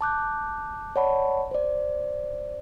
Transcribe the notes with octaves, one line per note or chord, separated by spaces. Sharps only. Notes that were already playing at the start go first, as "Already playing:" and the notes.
A5 D6 F#6 G6
C#5 D5 F#5 A5 B5 C#6
C5 D5